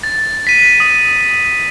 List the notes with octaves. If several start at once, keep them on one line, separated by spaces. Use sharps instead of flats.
A6
B6 D#7
D#6